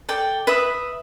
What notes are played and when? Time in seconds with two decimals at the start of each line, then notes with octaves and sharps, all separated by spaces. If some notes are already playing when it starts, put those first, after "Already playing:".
0.09 A4 D5 G5
0.47 B4 E5 B5 D#6